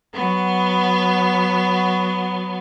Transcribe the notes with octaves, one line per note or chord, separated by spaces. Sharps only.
F#3 B3